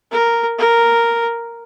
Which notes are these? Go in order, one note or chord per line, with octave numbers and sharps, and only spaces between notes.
A#4
A#4